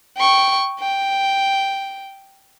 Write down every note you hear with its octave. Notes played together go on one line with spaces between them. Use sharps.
G5 C#6
G5